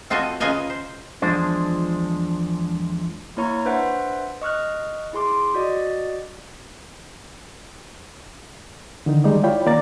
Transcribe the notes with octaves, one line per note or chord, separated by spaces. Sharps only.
C4 F4 F#4 A4 D#5 G#5
C#3 F4 B4 D#5 G#5 A#5
C5
E2 F3 G#3 D4 C5
A#3 E4 C#5 A#5 C#6
D4 B4 C5 E5 F#5
D#5 C#6 F6 F#6
E4 G#4 C6 D6
F#4 D5 D#5
D3 D#3 D#4
D#3 G3 G#3 D#4 D5 D#5
E4 F4 C#5 D5 G5 B5
D#3 A#3 D5 A#5 A6